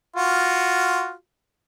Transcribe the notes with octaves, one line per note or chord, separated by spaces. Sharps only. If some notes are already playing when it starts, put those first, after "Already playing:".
F4 F#4